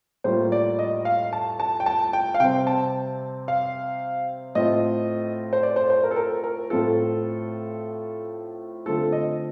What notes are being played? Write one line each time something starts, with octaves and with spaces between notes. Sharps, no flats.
A2 G3 A#3 F4 C5
D5
D#5
F5
A5
A5
G5
A5
G5
F5
C3 G3 C4 G5
A5
F5
A2 A3 C4 F4 D#5
C5
D5
C5
C5
A#4
A4
A#4
A#4
A2 A3 C4 F4 A4
D3 A3 C4 F4 A4
D#5